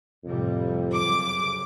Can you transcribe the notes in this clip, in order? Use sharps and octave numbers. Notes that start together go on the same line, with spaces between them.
F2 A2 C3 G3
F#2 C#3 D6